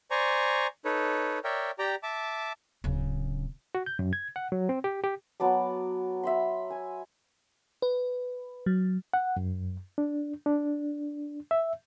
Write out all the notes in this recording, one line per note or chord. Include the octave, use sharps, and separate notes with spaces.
C5 D5 G#5 A#5 C#6
D#4 A4 B4 C#5
A#4 C#5 D5 E5 G5
G4 D5 G5 A#5
E5 A5 D6
D1 C#3
F#4
G6
F#2
G#6
F#5
F#3
C4
G4
G4
F#3 B3 A5 D6
E5 B5 C6
G#5
B4
F#3
F#5
F#2
D4
D4
E5